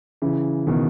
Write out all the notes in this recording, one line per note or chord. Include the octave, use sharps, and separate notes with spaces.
C#3 E3
B2 D#3